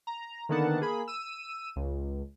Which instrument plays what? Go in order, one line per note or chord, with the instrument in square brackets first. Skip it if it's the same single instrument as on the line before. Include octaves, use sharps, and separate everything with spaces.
[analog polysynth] A#5
D3 D#3 A#3 B3 F#5 A5
A#3 G#4 B5
E6 D#7
C#2